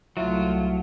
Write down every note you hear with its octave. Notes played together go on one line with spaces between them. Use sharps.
C2 F#3 A3 E4 F4 E5